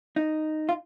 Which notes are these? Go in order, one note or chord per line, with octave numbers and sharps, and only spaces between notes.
D#4
F4